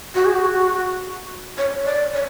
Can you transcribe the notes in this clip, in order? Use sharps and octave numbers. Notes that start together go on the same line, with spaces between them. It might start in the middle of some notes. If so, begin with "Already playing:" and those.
F#4
G#4
F#4
C#5
D5
C#5